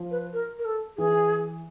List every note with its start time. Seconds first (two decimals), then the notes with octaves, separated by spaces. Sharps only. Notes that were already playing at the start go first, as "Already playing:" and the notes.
Already playing: F3
0.11 B4
0.33 A#4
0.59 A#4
0.65 A4
0.97 E3 G#4